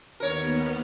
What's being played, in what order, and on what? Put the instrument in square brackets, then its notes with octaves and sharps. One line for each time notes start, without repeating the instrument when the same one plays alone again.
[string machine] D#2 B3 F6 [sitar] A#4 C#5